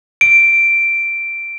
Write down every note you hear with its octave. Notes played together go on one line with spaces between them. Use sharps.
D7